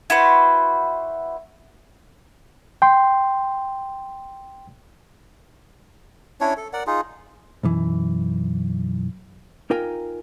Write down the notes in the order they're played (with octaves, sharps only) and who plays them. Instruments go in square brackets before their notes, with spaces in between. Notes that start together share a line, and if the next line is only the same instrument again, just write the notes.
[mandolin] E4 F#4 B4 C5
[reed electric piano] G5 C6
[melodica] C#4 D4 E4 C#5
A4
A#4 D5 F#5
D#4 F4 G#4
[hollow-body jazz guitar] B1 F#2 E3
D#4 F4 A#4 G5 G#5